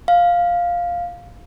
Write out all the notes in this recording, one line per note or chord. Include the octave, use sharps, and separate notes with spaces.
F5